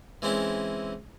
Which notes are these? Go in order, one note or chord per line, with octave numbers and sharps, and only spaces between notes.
E3 G#3 C4 C#4 E4